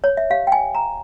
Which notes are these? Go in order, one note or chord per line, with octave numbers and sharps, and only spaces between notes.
C#5
E5
G4 C#5 F5
G5
G#5
A#5